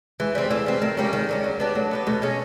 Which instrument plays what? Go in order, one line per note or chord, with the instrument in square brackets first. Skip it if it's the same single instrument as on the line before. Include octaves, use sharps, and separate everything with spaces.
[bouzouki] E3 [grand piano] G#3
[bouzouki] G3 C4
[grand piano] G#3
[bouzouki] E3 [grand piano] A3
[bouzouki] G3 C4
[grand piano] G#3
[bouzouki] D#3 [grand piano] A3
[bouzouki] G3 A#3 C#4 [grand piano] G#3
[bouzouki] D#3 [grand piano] G#3
[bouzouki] G3 A#3 C#4
F#3
B3 D4 G4
[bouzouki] F#3 [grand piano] A3
[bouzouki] B3 D4 G4
[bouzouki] B2 [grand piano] A3
[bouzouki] G#3 C#4